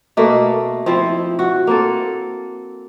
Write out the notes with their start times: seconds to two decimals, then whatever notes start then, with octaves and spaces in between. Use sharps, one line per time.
0.17 B2 A3 A#3
0.86 F3 C4 E4
1.39 F#4
1.67 A#3 C4 A4